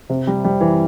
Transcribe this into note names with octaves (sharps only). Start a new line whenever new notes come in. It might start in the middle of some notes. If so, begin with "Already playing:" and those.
C3
G3
G3
E3